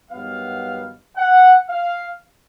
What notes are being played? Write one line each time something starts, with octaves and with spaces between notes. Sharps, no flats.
G2 D#3 F#3 B3 F5
F#5
F5